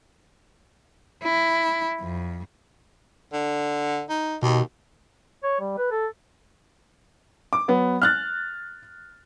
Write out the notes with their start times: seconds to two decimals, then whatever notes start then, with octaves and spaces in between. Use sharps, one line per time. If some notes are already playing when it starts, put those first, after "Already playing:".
1.23 E4
2.01 F2
3.33 D3
4.10 D#4
4.42 D#2 B2
5.43 C#5
5.60 G3
5.78 B4
5.91 A4
7.53 D6
7.68 F#3 B3
8.02 F6 F#6 A6